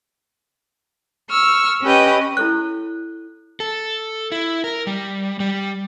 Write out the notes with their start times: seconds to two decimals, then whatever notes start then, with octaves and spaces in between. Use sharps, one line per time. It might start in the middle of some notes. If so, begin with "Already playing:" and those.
1.29 C#6 E6 F6
1.82 C#4 G4 B4 D#5 G5
2.37 E4 A4 C#5 F#6
3.60 A4
4.32 E4
4.64 A#4
4.87 G3
5.40 G3